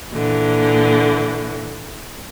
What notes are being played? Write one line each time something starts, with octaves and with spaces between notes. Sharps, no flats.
A#2 D3 E3